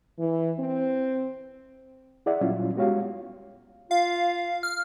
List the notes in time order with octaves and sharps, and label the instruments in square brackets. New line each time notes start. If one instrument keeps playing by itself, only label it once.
[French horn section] E3
C4
[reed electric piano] E4 G#4 D5 E5 F#5
A#2 F#3 G3 C#4 E4 F4
G#3 B3 F#4 G4 C#5 F5
[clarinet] F4 [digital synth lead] F5
[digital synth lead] F6